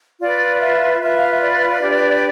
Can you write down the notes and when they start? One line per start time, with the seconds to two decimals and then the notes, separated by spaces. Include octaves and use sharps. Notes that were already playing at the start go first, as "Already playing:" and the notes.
0.20 F4 B4 D5
0.61 E5
1.00 F4 B4 E5
1.16 F5
1.28 E5
1.41 D5
1.82 D4 G4 B4